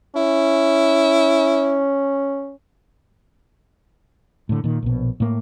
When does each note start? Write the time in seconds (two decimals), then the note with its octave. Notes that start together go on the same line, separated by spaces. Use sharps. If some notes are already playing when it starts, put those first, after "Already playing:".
0.16 C#4 E4
4.49 A2 D3
4.64 A#2 D#3
4.83 A#1 B2
5.20 A2 A#3